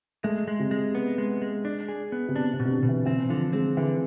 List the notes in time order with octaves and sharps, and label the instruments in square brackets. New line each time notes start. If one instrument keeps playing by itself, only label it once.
[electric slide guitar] G#3 [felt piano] A3
[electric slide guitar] G#3
[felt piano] C3
[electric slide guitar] G#3
B3
G#3
G#3
D4
G#4
B3
[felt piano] C3
[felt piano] B2 [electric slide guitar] D4
[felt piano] C3
[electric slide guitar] B2
[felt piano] C3
D3
[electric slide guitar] B2
[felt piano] E3
[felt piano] E3 [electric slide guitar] C4
[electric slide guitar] D3 [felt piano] F3
[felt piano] G#3 [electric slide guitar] C4
[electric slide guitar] D3 [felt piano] E3